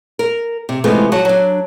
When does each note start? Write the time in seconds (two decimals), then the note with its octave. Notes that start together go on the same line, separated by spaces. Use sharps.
0.19 A#4
0.69 C3
0.84 C3 E3 F3 G#3 A3 B3
1.12 F#3 F#4 A5
1.25 F#3 D4